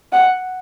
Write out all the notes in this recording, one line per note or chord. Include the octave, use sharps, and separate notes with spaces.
F#5